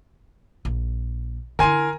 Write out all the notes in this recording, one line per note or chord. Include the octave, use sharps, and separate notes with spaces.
A#1
D3 E4 A#4 G#5 C6